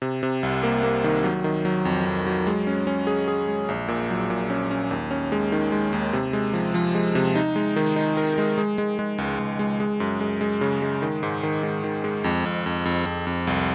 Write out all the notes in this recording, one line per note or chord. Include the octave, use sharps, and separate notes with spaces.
C3
C3
C2
A#3
A#3
D#3
F#3
D#3
F#3
F2
F2
F#3
G#3
C#4
C#4
G#4
G#4
G#3
A#1
A#2
F#3
A#2
C#4
C#4
D#2
C#4
G#3
D#3
G#3
D#2
C3
G#3
F3
F3
G#3
C3
D#4
G#3
D#3
D#4
A#4
G#3
G#3
G#3
G#3
C#2
C#2
G#3
G#3
F#2
G#3
G#3
C#3
G#3
D#3
G#2
D#3
G#2
D#3
G#3
F2
F2
F2
F2
F2
F2
C2